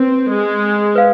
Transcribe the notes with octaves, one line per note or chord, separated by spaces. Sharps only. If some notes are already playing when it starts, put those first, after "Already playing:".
Already playing: C4 B4
G#3
B4 F5